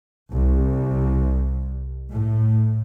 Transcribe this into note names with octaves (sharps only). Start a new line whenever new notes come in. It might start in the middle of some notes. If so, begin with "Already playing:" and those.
C2
A2